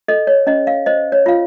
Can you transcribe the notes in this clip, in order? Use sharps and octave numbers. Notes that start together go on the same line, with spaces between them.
A4 D#5
C#5
C#4 D#5
F5
C5 D#5
C#5
F4 F5